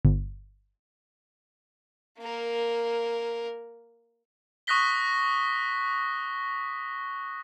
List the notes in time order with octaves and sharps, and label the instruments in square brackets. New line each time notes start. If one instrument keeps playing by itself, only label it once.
[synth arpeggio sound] G1
[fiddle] A#3 A#4
[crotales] C#6 D#6 F#6 A#6 B6 G7